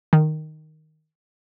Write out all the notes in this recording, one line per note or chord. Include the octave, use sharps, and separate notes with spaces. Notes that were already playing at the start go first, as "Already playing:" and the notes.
D#3